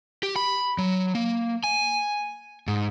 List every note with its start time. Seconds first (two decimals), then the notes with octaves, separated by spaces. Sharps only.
0.23 G4
0.36 B5
0.78 F#3
1.15 A#3
1.64 G#5
2.68 G#2